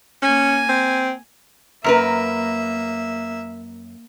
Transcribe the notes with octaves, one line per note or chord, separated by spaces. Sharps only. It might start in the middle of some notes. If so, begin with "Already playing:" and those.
A#3 C#4 G#5
C4
F#2 A#3 A#4 B4 E5